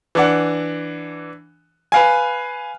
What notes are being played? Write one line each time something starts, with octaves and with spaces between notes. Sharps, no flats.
E3 D4 F#5
B4 F5 G#5